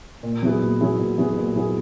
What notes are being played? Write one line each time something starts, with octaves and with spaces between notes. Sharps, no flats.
A#2
F#3 B3 E4 G#4
A#2
F#3 B3 E4 G#4
A#2
F#3 B3 E4 G#4
A#2
F#3 B3 E4 G#4